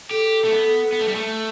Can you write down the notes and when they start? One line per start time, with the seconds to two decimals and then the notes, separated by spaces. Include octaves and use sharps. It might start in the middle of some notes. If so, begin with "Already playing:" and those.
0.11 G4 A4
0.45 A3
0.52 B3
0.93 B3
1.01 A3
1.08 G3
1.16 A3